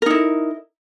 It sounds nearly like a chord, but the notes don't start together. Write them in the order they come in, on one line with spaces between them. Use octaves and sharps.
A#4 D#4 E4